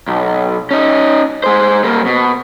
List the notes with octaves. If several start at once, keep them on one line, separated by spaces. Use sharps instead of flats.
B1
C#4 D#4
G#3 C5
G3 A#3
B2